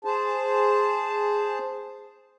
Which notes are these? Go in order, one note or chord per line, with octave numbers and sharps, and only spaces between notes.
G#4 C5 A5